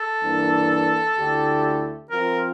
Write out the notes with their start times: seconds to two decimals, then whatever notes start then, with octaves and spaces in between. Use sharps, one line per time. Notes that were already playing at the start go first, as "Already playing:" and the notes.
Already playing: A4
0.22 G2 E3 A#3 D4
1.16 D2 D3 A3 E4 G4
2.11 F3 C4 F4 A#4